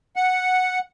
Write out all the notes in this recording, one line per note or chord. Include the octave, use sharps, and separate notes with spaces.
F#5